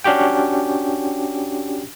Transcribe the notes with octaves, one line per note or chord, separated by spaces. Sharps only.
C#4 D4 F#4 G4 G5